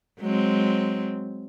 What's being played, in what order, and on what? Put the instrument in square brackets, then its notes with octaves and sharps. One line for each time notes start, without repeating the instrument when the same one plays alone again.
[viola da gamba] F#3 G#3 C4